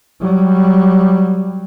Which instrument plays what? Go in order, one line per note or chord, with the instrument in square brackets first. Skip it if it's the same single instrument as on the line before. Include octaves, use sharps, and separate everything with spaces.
[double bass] F#3 G3